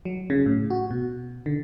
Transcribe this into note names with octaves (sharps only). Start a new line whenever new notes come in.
F#3
C#3
A2
F#4
B2
D3